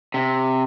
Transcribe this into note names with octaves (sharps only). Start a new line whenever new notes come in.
C3